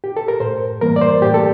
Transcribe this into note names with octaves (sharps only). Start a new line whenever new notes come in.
G4
A4
A#4
A2 C5
E3 G3 A#3 A#4
D5
C5
A2 G4
A4